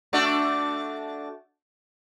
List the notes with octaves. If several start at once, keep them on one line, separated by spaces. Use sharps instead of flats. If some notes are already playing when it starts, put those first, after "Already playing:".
A3 D4 F#4